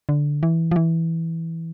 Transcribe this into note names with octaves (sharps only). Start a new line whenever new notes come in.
D3
E3
F3
E3